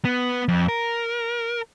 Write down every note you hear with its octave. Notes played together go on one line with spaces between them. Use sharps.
B3
F2
A#4